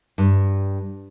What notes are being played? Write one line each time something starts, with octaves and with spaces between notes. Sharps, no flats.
G2